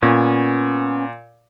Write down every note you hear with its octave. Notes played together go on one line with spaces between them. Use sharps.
A#2 B3 C#4